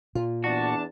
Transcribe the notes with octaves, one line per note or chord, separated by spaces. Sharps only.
A#2 F4
E2 D4 F#4 A5